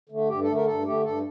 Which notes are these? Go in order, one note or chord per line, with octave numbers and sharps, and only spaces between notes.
D3 A3
G2 G4
A4
D3 A3
A#4
G2 A4
D3 A3 G4
G2 A4